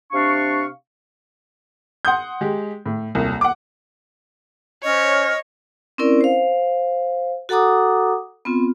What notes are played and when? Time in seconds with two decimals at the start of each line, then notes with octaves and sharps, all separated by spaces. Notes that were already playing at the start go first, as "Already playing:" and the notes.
0.12 C3 D4 F5 C#6
2.05 F#5 C6 D#6 G6
2.41 G#3 G4
2.86 A2
3.15 D#1 C2
3.41 F#5 D6
4.84 C#4 C5 C#5 D#5 F6
5.98 C4 C#4 E4 A#4 D5
6.21 C5 F5
7.49 F#4 A4 F#5 A#5 D6 D#6
8.45 B3 C4 F4